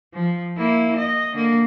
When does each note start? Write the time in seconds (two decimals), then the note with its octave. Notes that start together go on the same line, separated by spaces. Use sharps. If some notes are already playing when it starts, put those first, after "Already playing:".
0.14 F3
0.57 A#3 E4
0.97 D#5
1.34 D3 A#3